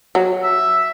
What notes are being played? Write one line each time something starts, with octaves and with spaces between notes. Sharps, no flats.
F#3
E5